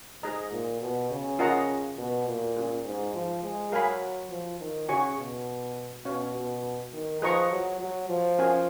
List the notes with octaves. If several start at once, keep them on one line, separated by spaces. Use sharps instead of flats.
G#2 G#4 D#5 A#5
A#2
B2
C#3
F4 A#4 D#5 F#5 A#5
B2
A#2
C#4 F4 G#4
G#2
F3
G#3
F#3 A#4 F5 G#5 B5
F3
D#3
C#3 F#4 C#5 G#5 C#6
B2
B2 C#4 F#4 C#5 F5
B2
D#3
F3 G#4 B4 D#5 A#5 C#6
F#3
F#3
F3
C#4 F#4 A#4 F5 G#5